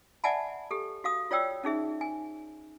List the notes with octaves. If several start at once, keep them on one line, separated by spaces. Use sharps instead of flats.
D5 E5 F#5 G#5 A5 B5
G4 A4
F#4 F5 D#6
F4 C#5 D5 G5 E6
C#4 D#4 G#4 E5
G#5